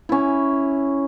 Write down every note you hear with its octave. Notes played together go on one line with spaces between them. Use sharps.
C#4 E4